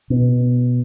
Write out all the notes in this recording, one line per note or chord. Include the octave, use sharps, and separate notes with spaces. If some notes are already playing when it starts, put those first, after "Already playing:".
B2